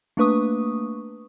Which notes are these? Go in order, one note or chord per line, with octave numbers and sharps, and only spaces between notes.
A3 A#3 D4 B4 C#6 D#6